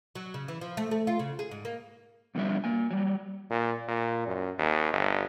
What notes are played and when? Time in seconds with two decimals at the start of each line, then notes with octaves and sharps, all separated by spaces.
0.15 F#3
0.34 C#3
0.48 E3
0.61 F3
0.77 A3
0.91 A3
1.07 F4
1.19 C#3
1.39 G#4
1.51 G#2
1.65 A#3
2.35 F2 B2 D3 F3 G3 E5
2.64 A#3 G#5
2.91 F#3 G3
3.50 A#2
3.88 A#2
4.27 F#2
4.59 D#2
4.93 G1